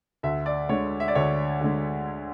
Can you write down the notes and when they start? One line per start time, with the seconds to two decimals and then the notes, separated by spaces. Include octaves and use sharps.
0.23 D2 E5
0.46 D5
0.69 D3 G#3 C#5
1.00 E5
1.08 D5
1.15 D2 C#5
1.61 D3 G#3